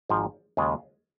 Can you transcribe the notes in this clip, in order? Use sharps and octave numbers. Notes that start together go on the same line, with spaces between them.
G#1 G#2 F3
D#2 C#3 G#3 C#4 F4